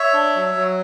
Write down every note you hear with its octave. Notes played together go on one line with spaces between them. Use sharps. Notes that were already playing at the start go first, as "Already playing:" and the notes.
Already playing: C#5 E5
D4
F#3
F#3